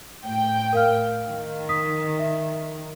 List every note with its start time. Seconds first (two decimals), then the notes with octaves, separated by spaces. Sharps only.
0.24 A2 G5
0.73 A#4 F5 F6
1.27 D#3
1.69 D#6 B6
2.19 E5